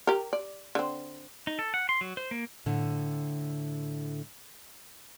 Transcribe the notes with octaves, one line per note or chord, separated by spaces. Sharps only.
G4 A#4
D5
D3 C4
D#4
A4
F#5
C6
F#3
C5
A#3
A2 D3